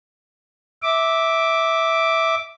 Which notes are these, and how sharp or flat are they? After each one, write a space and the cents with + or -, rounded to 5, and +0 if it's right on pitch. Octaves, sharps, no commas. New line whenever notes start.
E5 -10 D6 +0